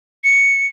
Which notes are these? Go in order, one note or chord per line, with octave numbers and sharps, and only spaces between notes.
C#7